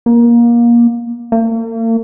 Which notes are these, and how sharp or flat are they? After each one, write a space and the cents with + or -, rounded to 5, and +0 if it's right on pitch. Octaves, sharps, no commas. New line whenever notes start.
A#3 +20
A#3 -45